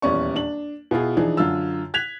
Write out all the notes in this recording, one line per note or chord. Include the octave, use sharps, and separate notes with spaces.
D#1 E2 C#4 D5 C#6
D4 F#7
B2 E4 F4 G#4
E3 F3 D4 D#4 G#4
F#2 D3 F4 E6
F#6 G#6 B6 F7